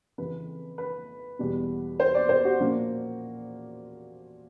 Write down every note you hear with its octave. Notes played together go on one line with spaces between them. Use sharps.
F2 C#3 E3 B4
B4
E2 B2 G3
C5
D5
C5
F#4
A#2 F3 A#3 C#4